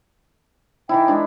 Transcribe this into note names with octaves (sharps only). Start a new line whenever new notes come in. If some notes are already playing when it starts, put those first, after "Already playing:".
E3 D#4 E4 G5
G#3 D4